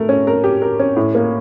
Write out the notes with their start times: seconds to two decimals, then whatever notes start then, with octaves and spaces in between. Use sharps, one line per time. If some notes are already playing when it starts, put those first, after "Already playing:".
Already playing: A3 A#4
0.09 C#4
0.27 A#4
0.44 G4
0.62 A#4
0.79 C#4
0.97 A2
1.15 A#3